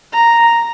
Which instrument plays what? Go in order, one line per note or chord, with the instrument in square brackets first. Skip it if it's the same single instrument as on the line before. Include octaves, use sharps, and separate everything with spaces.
[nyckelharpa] A#5